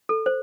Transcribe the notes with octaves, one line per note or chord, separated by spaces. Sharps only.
A4
C5